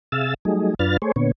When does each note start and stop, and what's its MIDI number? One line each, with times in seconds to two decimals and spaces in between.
0.12 0.34 48
0.12 0.34 68
0.12 0.34 76
0.12 0.34 77
0.12 0.34 88
0.12 0.34 93
0.45 0.74 54
0.45 0.74 55
0.45 0.74 57
0.45 0.74 63
0.45 0.74 68
0.79 0.97 42
0.79 0.97 62
0.79 0.97 65
0.79 0.97 71
0.79 0.97 89
0.79 0.97 93
1.02 1.12 57
1.02 1.12 68
1.02 1.12 72
1.02 1.12 73
1.16 1.32 46
1.16 1.32 50
1.16 1.32 59
1.16 1.32 73